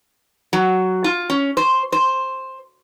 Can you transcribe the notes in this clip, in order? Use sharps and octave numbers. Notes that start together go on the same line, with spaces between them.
F#3
F4
C#4
C5
C5